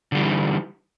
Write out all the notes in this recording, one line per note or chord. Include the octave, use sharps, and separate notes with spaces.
D3 E3 G3